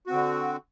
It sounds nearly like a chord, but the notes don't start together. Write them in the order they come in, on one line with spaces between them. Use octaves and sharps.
F#4 C4 D3